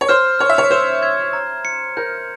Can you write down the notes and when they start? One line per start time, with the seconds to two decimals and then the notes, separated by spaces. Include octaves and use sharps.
0.01 C#5
0.09 C5 F6
0.39 C#5 F6
0.49 E5
0.58 C#5
0.71 C5 E7
1.03 G#6
1.33 A#5
1.65 C#7
1.97 A#4 G6